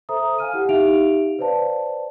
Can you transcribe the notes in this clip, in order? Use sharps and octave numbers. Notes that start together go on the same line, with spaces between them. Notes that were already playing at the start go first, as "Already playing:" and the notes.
A4 C5 E5 A#5 D#6
F5 G#5 F6 D#7
E4 G4 F#5
D#4 G4 E5 F5 D7 F7
B4 C5 D5 F5 A5